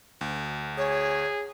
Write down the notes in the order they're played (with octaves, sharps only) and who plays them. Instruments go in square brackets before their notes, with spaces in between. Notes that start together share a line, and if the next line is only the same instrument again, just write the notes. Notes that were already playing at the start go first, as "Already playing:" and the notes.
[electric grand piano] D2
[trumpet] G#4 [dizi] C#5